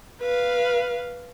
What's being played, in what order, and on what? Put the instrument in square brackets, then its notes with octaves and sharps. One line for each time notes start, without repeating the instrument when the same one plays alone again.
[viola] B4 F5